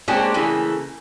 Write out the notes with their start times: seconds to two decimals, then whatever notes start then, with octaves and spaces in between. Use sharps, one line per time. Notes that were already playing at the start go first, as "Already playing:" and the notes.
0.08 G#3 A#3 C4 D4 G4 C#5
0.34 C#3 E3 A3 A#3